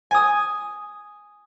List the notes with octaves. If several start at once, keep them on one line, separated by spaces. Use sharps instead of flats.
G#5 D#6